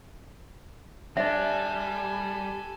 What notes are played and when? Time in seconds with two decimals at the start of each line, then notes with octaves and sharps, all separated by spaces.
1.17 G3 D4 A4 D#5 E5 G#5